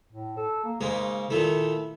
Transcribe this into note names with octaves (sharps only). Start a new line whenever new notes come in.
A2
A4
A#3
G#2 C#3 G#3 A#3
A#2 D#3 A3 E4